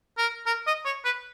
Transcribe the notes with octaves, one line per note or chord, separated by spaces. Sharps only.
A#4
A#4
D#5
C#5
B4